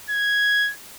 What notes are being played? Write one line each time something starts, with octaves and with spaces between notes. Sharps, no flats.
G#6